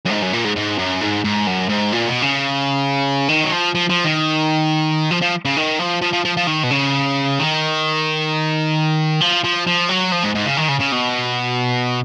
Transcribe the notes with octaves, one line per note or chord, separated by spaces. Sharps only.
F#2
G#2
F#2
A#2
G#2
G#2
F#2
G#2
G#2
F#2
G#2
A#2
B2
C#3
D#3
F#3
F3
F3
F3
D#3
F3
F3
C#3
D#3
F3
F3
F3
F3
F3
D#3
B2
C#3
D#3
F3
F3
F3
F#3
F3
G#2
G#2
C#3
D#3
C#3
C#3
B2